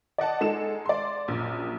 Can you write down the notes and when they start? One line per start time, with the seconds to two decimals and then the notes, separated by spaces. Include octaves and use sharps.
0.18 D5 D#5 F#5 A5
0.41 G#3 D#4 A4 E7
0.86 D5 C6
1.28 A#1 F#2